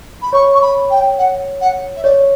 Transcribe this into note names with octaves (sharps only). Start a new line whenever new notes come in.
B5
C#5 C#6
C#6
B5
G5
F#5
F#5
E5
C#5 D5